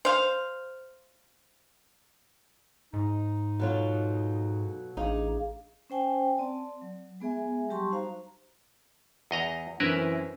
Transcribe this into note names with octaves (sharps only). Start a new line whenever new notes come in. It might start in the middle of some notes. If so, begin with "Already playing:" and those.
C5 F5
G#2 D#4
B2 F#3 F4 F#4 A4
A1 D4 D#4 G#4 F5
C#4 C5 G5 G#5
C4 D5 A5
F#3
G#3 B3 G#4 E5 G#5
F#3 G3 G4 A5 C6 C#6
D#4 F#4 C5 F5 A#5
E2 D#5 A#5
F#2 E3 C4 E4 A#4 B4